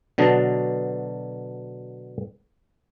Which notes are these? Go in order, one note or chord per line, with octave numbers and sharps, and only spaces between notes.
B2 D3 F#3 D4 D#5 A5